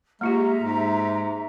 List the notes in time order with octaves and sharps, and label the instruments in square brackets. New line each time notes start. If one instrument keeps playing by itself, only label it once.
[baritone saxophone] G#3 [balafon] A#3 F4 G4 [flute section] E5 A#5
[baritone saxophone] G#2